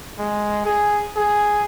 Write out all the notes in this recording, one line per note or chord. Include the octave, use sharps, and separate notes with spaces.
G#3
G#4
G#4